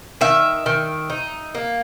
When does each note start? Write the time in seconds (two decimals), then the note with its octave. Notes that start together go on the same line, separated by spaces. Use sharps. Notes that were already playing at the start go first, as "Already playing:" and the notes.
0.21 D#3 E5
0.66 D#3
1.10 D#4
1.55 A#3